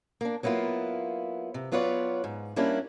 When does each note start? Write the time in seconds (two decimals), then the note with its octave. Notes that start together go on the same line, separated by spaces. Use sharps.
0.21 A#3 D4
0.43 F#3 A#3 B3 E4 F4
1.54 C3
1.72 F#3 B3 F4 B4 C#5 D5
2.24 G#2
2.56 G3 A#3 C#4 D4 E4 G4